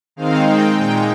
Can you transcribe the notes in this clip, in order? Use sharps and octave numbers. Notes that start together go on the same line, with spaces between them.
D#3 G#3 C4 D#4 F5
G5
A#2 G#3 D#4 G5